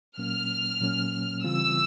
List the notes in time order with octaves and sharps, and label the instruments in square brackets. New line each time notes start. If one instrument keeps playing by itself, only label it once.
[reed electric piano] A#2 F#3 A#3 C#4 [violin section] F6
[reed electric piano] A#2 F#3 A#3 C#4
[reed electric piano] C#3 E3 G3 C4 F4 [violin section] E6